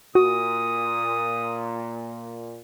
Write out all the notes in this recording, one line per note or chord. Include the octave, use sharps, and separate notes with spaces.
A#2 F#4 D#6